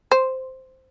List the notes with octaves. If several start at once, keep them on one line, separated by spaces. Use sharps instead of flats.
C5